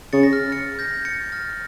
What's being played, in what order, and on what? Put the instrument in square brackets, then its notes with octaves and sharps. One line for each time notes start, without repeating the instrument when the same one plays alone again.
[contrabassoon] C#3 [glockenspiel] A6 C#7
[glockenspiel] A#6
F6 A6
A6 C#7
G6 A#6
A6 C#7
F6 A6